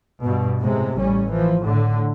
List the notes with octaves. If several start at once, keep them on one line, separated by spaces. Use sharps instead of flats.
G2 B2
A2 C3 G#3
A1 G3 C#4
E3 F3
A2 D3